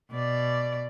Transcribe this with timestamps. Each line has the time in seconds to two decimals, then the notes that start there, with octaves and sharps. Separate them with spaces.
0.11 B2 D5